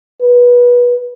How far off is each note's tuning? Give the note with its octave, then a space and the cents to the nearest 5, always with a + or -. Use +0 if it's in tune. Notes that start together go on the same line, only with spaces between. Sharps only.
B4 -20